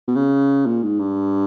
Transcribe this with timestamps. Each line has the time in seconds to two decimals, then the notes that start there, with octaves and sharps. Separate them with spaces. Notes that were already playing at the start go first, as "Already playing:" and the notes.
0.08 B2
0.16 C#3
0.67 A#2
0.83 G#2
1.00 G2